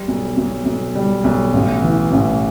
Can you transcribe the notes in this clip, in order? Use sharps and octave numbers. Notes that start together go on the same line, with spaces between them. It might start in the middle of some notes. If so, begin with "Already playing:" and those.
Already playing: G3
B1
B1
B1
G3
B1
A1
E3
A1